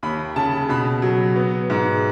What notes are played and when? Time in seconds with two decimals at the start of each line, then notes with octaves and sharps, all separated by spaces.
0.03 D#2 B5
0.36 C#3 A5
0.69 B2 B5
1.02 F#3
1.36 B3
1.70 G#2